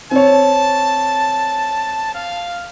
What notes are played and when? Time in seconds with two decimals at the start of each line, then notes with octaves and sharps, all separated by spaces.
0.11 C4 C#5 A5
2.15 F5